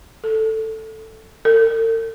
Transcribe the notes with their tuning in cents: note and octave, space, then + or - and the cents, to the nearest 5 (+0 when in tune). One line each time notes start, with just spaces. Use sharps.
A4 +5
A4 +45